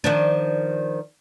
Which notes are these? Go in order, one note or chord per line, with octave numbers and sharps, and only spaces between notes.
D#3 F3 D4